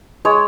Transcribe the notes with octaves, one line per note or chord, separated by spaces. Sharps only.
G#3 C#5